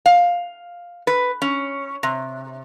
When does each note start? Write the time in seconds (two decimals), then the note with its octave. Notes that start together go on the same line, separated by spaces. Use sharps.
0.06 F5
1.07 B4
1.42 C#4
2.03 C3